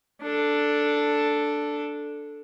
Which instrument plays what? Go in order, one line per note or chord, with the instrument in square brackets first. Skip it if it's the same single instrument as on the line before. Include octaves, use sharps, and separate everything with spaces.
[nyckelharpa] D4 A4